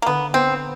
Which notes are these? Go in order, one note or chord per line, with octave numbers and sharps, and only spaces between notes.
A#3
D3 B3
B3 C4